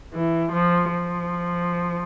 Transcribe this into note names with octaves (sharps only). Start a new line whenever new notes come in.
E3
F3
F3